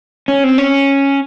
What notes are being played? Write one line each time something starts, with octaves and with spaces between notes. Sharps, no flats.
C#4
C4
C#4